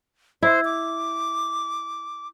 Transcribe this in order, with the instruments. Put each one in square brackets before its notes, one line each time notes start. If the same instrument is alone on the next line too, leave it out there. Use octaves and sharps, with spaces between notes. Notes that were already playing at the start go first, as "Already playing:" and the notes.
[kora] E4 [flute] C5
[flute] D6